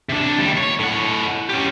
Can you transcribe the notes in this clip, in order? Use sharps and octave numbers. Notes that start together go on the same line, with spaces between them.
C3 D4
D#2 G3
C#5
A2 F#5
C#4 G4